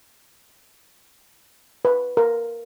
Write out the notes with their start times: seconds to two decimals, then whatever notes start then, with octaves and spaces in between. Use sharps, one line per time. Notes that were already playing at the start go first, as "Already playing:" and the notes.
1.85 B4
2.17 A#4